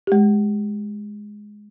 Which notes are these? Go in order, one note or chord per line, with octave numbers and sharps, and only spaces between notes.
G#3 G4